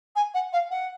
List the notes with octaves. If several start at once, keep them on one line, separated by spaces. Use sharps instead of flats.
G#5
F#5
F5
F#5